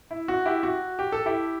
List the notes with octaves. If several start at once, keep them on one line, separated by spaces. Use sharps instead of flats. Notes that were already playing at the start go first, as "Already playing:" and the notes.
E4
F#4
E4 G4
F#4
G4
A4
E4 G4